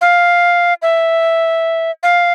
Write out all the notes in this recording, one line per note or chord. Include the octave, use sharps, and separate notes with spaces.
F5
E5
F5